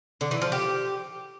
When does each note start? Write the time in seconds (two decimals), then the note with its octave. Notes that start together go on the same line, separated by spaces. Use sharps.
0.21 D3
0.31 E3
0.42 F3
0.52 G4